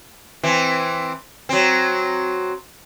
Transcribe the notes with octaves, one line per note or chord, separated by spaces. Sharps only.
E3 C4
F#3 C4